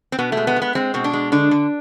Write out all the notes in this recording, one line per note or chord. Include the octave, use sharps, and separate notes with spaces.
C4
B2 B3
A3
G#3
B3
G#3
B3
G#3 C4
B2 C4
D4
G#3
D3 D4
D3